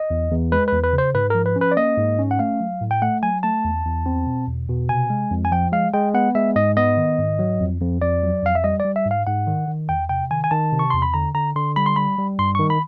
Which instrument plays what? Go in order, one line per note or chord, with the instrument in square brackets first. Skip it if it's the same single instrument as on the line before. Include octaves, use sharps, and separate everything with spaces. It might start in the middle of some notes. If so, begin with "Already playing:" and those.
Already playing: [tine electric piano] D#5
E2
E2
G#3 B4
B4
E2
B4
C#3
C5
G#2 B4
F3 A#4
B4
C#4
B4
D5
A#3 D#5
G#2
C#4
F#5
A3 F5
F#3
A2
G5
A3 F#5
F#3 G#5
A3 A5
E2
E2
C4
B2
E2
B2
C3 G#5
G#3
F2
G#5
F3 G5
G#3 F5
G#3 G5
B3 F#5
G#3 E5
G#2 D#5
B3 D#5
D#3
G#2
F#3
F2
F2
F2 D5
F#3
F2 F5
E5
G3 D#5
D5
G3
E5
G#2
F5
G#2 F#5
D#3
D#3
E2 G5
C3 G5
D#3 G#5
G#5
D#3 A5
C3
C#6
E2 C6
B5
D3 A#5
D3 A#5
D3 C6
G3 B5
C6
G3 B5
G3
G2 C6
D#3 C#6
B5